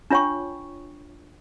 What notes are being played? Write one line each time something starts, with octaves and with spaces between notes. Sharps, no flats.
D4 F4 C#5 G5 C#6